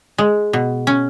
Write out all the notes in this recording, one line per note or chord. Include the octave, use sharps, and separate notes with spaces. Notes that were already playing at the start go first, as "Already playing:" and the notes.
G#3
B2
C#4